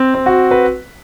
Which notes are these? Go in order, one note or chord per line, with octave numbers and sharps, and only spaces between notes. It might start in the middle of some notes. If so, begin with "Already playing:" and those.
Already playing: C4
C4
F#4
B4